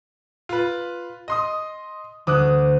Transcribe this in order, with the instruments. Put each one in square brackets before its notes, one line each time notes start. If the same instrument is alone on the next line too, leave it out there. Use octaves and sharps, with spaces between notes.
[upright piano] F4 B4
D#5 C6 D#6
[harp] D2 [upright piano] D6 D#6 F#6